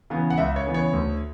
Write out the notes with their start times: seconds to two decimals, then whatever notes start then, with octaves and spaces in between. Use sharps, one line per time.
0.10 C#3 E3 B3
0.30 F#5
0.38 C#2 E5
0.56 C#5
0.66 C#3 E3 B3
0.74 C#5
0.93 D2